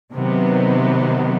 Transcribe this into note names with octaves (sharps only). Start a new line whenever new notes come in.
C3 D#3 F#3 B3